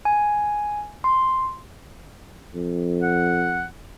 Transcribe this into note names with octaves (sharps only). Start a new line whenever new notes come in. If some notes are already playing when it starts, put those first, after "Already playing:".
G#5
C6
F2
F#5